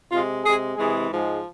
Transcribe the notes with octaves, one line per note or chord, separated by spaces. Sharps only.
C3 G#3 F4
C3 G#3 G#4
C3 E3 G#3 G#4
G#2 F3 G#3